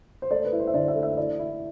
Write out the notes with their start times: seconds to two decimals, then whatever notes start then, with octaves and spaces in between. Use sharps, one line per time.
0.22 C5
0.31 A3 D5
0.45 B4
0.52 E4
0.60 C5
0.67 E5
0.74 D3 D5
0.88 E5
0.95 A3
1.03 E5
1.17 E4 D5
1.39 E4